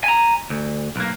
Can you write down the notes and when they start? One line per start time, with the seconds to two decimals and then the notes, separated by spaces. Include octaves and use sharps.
0.04 G#5 A#5
0.50 D2
0.96 B1 A#3